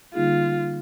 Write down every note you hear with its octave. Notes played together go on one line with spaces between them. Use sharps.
D3 G3 A#3 D#4 F4 G#4